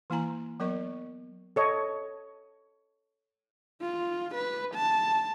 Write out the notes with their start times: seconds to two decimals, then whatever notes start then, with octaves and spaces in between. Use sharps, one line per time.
0.10 E3 A#3 E4 G#5 A#5
0.60 F#3 B3 A#4 D#5 C#6
1.56 A4 C#5 D#5
3.81 F4
4.35 B4
4.75 A5